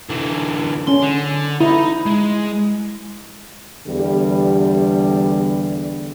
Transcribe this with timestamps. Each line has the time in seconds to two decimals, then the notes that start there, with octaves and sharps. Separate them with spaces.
0.10 D3 E3
0.88 C#4 C6
1.03 D3
1.60 D#4 E4
2.06 G#3
3.87 E2 D3 G3